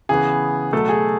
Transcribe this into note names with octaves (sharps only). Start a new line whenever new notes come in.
C#3 E3 B3 G#4
B2 F#3 A3 A4
G#4